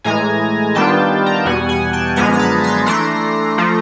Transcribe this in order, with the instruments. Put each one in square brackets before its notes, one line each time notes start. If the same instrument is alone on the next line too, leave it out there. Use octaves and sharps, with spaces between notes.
[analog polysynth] A2 E3 G#3 G#5 A#5
D#3 G3 B3 D4 F4 G5 A5
A#5
A5
E2 B2 G3 F#5 G#5
F#5 G#5
G5 A5
F#2 D3 F3 G#3 B3 G#5 A#5
A#5
A5 B5
A#5 C6
E3 A3 D4 A#5 C6
F3 A3